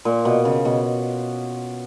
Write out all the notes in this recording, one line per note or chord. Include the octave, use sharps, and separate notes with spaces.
A#2
B2
C#3
B2